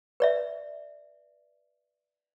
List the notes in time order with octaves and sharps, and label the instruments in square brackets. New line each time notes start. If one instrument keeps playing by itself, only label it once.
[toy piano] B4 D5 E5